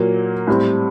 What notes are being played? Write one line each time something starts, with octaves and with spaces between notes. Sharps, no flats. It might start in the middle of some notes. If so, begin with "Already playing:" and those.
Already playing: A#2 F#3 A#3
A2 G3 C4